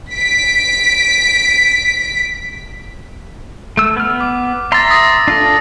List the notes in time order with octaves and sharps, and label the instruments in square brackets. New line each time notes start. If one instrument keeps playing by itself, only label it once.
[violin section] B6 D7
[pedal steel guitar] A3 E6
B3 F6
[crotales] D6
[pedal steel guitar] E5 A#5 C6 [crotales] A6 A#6
[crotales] D#6 A#6
[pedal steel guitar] D4 F4 A4